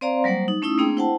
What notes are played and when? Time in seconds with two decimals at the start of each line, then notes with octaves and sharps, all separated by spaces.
0.01 C4 C5 D5 F5 A#5 C6
0.24 F#3 G3 A#3 C5 F#5
0.48 D#4
0.62 A3 C#4 D#4 E4 D#6 E6
0.78 A3 A#3 C4 D4 G#4 G5
0.97 E4 C5 F#5 G5 A5